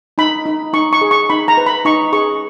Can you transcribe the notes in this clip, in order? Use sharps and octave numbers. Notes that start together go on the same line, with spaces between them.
D#4 B5
D#4
D#4 C#6
C#6
G#4
C#6
D#4 B5
A#5
B4
B5
D#4 C#6
G#4 C#6